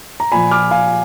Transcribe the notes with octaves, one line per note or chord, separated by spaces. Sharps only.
A#5
A#2 F3 G#5 B5
D6 F6
F5 G#5